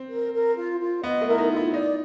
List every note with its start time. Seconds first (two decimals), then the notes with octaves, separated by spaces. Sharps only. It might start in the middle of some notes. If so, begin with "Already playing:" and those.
Already playing: C4
0.09 A#4
0.33 A#4
0.57 F4
0.80 F4
1.03 B3 D#5
1.21 A3
1.27 E4 A#4
1.38 D#4
1.51 F4
1.56 E4
1.73 D#4 D5